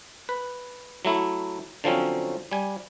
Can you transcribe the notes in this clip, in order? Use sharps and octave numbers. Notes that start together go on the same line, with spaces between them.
B4
F#3 A3 E4
D3 F3 F#3 C4 C#4
G3 G#5